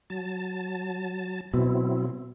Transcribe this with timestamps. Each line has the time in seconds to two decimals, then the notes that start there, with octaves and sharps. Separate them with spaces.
0.10 F#3 A5
1.54 B2 F#3 C4 E4